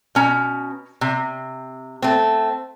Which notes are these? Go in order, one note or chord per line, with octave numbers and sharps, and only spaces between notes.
B2 C#4 A#5
C3
A3 C4